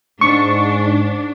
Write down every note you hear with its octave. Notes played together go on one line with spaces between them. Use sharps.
G#2 D4 C#6